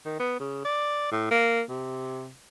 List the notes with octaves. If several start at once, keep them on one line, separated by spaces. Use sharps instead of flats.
D#3
B3
C#3
D5
A2
A#3
C3